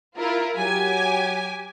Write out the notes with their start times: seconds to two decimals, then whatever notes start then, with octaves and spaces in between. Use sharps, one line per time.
0.17 E4 F4 A#4
0.56 F#3 G4 G#5